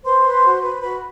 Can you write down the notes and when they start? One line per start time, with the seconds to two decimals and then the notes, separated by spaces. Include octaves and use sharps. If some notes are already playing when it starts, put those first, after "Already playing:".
0.05 B4 C5 C6
0.25 B4
0.44 F#4
0.62 B4
0.82 F#4 B4 B5